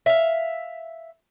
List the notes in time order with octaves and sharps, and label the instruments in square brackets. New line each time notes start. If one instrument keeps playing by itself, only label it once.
[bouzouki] E5 F5